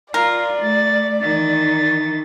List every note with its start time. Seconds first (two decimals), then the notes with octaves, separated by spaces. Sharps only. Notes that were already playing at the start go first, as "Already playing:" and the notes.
0.14 F4 A#4 D5
0.62 A3 A6
1.21 D#3 E3 A6